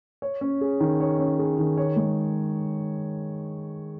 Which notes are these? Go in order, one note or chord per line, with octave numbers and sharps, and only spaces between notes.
C#5
C#4
G#4
D#3
C#5
C#4
G#4
D#3
C#5
G#3